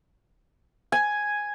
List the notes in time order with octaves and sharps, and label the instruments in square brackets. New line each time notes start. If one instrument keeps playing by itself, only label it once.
[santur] G#5